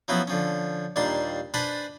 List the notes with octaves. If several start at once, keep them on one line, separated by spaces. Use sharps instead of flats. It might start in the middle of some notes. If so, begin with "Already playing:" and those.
F3 F#3 B3 C#4 E4 F#4
D3 F3 C#4
D#2 A#2 G3 D4 C6
D4 B4 C5 G#5 A5 B5